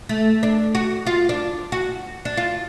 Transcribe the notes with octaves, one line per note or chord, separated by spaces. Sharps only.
A3
D4
F#4
F4
D4
F#4
D4
F4